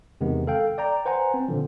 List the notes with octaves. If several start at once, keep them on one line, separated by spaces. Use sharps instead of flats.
E2 C3 D#3 G#3 B3
A4 F5 G5
D5 G5 A#5
B4 C5 F#5 G#5 A#5
C4
A#2 D3 F3